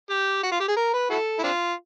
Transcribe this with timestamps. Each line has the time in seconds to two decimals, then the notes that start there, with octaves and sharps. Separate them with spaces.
0.10 G4
0.43 F#4
0.51 F4
0.60 G4
0.68 G#4
0.76 A#4
0.94 B4
1.10 E4 F#4 A4
1.39 E4
1.43 C4 D4 F4